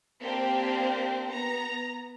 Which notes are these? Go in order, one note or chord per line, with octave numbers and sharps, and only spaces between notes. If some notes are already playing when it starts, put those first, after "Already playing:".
A#3 C4 D4 G4 C5
B3 A#5